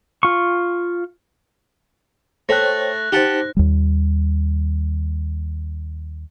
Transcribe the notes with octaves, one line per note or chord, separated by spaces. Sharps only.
F4 C#6
A3 C5 C#5 G5 F#6 A#6
D#4 G4 C5 F#5 A5
D#2 G3